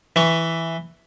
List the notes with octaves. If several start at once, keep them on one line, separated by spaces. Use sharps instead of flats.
E3 C#6